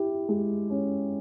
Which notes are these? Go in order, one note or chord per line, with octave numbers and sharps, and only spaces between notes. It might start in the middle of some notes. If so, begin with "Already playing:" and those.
Already playing: E4 G4
G#3
C#4